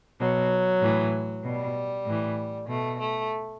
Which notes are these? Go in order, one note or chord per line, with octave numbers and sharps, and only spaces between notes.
B2 F#3
A2 E3
B2 G3
A2 E3
B2 A3
A3